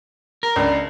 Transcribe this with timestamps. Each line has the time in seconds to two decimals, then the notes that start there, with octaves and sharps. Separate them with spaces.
0.43 A#4
0.56 C#2 D4